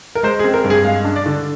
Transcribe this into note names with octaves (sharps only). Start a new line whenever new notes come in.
A#4
G#3 C5
G#4
C4
A#4
G2
G#4
G#3 F5
D4
D5
D3